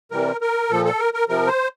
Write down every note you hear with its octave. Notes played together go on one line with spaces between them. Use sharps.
C3 E3 G3 A#4
A#4
A#2 F3 A4
A4
A#4
A#4
C3 F3 A#4
C5